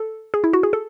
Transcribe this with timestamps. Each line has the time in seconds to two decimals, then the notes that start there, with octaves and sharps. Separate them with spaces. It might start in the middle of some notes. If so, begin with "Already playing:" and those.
Already playing: A4
0.34 G#4
0.44 E4
0.53 F#4
0.63 G#4
0.73 A4